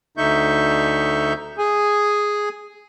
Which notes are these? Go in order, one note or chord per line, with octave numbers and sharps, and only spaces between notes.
D2 D3 D#4 E5 C#6 G6
G#4 G#5